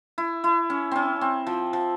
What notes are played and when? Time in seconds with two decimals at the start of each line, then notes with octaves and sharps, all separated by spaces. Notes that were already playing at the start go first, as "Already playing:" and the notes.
0.18 E4
0.44 E4
0.70 C#4
0.91 C4 C#4
1.21 C4
1.47 F3
1.73 F3